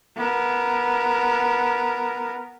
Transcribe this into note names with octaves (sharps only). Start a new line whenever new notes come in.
B3 A#4